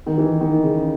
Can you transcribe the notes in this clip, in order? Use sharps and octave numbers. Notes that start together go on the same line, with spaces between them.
D#3
E3
D#3
C#3